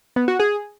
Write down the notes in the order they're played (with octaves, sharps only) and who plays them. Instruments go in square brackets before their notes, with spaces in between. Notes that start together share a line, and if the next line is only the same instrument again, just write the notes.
[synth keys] B3
F#4
G#4